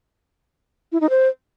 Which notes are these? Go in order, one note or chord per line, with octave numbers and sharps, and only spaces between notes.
E4
D#4
C5